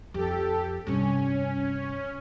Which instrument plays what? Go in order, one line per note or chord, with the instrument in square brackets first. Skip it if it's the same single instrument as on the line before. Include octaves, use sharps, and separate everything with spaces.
[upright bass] F2 [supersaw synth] G4 A4
[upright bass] G2 C3 [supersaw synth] C#4